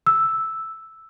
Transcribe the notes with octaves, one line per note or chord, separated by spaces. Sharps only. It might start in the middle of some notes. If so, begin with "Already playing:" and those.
E6